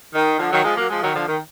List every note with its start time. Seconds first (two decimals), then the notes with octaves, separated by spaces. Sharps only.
0.15 D#3
0.39 D3 F3
0.52 D#3 F#3
0.64 F3 G#3
0.77 F#3 A#3
0.90 F3 G#3
1.02 D#3 F#3
1.15 D3 F3
1.28 D#3